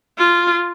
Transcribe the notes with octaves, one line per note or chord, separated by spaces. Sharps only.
F4